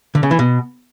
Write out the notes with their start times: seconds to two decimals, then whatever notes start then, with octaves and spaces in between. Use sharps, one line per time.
0.15 D3
0.23 C#3
0.31 E3
0.39 B2